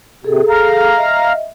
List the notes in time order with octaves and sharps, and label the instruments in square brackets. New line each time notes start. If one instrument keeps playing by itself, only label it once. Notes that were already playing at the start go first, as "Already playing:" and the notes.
[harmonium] C3 [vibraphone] G#4 A4
[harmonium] F5 A#5
[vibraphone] D#5 E5